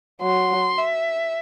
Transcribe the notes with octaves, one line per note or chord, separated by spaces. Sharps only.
F#3 C6
E5